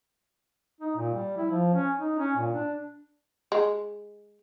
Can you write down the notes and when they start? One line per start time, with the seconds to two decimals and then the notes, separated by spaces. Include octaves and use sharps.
0.80 D#4
0.96 A#2
1.13 G3
1.37 E4
1.50 F3
1.74 C#4
1.98 D#4
2.19 C#4
2.36 A#2
2.53 D4
3.52 G#3